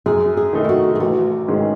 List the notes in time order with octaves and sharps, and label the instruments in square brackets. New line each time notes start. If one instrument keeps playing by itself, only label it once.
[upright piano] F#2 [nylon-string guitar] G#4
[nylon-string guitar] G#4
[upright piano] D#3 A3 D#4
[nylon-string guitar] E4
F#4
G#4
[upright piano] A1 [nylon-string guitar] F#4
[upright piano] G#2 D#3 G#3 C#4